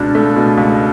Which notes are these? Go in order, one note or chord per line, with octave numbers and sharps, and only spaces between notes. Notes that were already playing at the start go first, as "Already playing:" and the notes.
Already playing: C#2 B2 D4
A3
B2
C#2